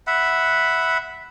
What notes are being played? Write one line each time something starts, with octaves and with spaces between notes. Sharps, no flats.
E5 F#5 B5